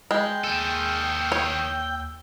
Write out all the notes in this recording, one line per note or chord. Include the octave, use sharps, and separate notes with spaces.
G#3 G5
D#2 D#3 A4 E6
C#5